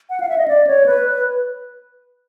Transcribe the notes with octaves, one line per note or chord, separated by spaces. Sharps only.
F#5
F5
E5
D#5
D5
C#5
B4